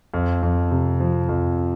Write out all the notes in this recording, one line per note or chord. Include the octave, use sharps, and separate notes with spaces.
F2
F2
C3
F3
F2